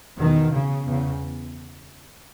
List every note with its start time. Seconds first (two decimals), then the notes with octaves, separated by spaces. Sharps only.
0.18 E2 B2 D#3
0.52 C#3
0.87 E2 C#3